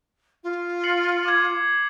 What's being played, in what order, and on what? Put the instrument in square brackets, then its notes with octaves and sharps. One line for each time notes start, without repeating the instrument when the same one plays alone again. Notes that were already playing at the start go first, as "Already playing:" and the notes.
[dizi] F4
[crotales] C7 C#7 F#7
D6 G#6